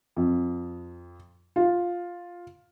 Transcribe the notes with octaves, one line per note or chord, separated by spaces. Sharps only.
F2
F4